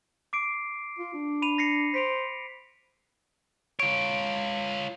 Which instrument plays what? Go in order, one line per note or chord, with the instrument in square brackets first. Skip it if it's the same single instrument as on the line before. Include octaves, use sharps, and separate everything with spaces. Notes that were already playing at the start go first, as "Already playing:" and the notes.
[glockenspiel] D6 C7 D7
[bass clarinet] F4
D4
[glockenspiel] B5 D#7 F7
A#6 C7 C#7
[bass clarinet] C5 [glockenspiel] B6 D7 F7
[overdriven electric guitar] F4 C#5 [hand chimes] D7